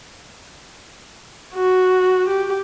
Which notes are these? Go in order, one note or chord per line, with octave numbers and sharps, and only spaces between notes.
F#4
G4